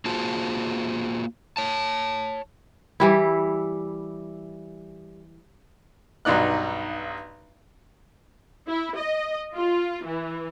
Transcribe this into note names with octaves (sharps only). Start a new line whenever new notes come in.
A#3 F4 F#4 G#4 C5 A5
C#5 A5
E3 G3 E4
B1 G2 D#4 D5 F#6
E4
D#5
F4
E3